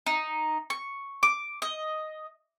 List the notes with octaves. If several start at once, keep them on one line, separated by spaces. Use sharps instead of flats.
D#4
C#6
D6
D#5